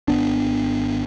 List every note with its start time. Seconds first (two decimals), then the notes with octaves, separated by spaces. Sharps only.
0.08 G#1 G#2 B3 D4